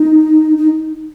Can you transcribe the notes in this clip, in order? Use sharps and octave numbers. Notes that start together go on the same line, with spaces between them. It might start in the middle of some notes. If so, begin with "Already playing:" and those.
Already playing: D#4
D#4